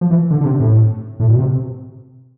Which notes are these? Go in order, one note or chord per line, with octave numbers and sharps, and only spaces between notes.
F3
E3
D3
D3
C3
A2
A2
B2
C3